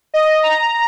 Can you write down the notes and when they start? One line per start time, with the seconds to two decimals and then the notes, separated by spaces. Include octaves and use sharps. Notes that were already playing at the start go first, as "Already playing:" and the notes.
0.14 D#5
0.43 A#5